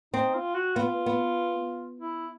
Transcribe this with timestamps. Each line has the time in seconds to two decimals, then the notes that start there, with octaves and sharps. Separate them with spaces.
0.14 C4 D#4
0.35 F4
0.55 F#4
0.76 B3 F4
1.06 B3
2.00 E4